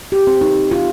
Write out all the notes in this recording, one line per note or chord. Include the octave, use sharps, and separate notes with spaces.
G4
C4
D#4
F4